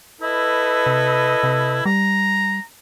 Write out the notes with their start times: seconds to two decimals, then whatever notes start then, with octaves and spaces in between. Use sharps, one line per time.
0.21 E4 A4 B4 D#5
0.86 C3
1.43 C3
1.86 G3 A#5